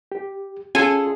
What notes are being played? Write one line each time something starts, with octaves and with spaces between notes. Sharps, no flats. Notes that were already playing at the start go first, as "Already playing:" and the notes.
G4
C#4 F4 G#4 A4 G#5